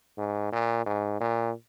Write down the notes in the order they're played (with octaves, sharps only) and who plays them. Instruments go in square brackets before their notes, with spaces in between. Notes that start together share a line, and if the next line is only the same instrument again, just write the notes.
[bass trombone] G#2
A#2
G#2
A#2